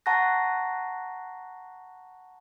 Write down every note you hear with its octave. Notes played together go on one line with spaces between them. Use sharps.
F#5 A5 A#5 C#6 F#6 A#6